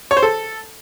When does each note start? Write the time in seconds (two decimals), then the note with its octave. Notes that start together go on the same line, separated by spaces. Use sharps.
0.11 C#5
0.17 C5
0.23 A4